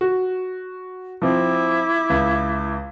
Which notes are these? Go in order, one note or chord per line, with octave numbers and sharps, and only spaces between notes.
F#4
F3 C4 E4 D6
C#2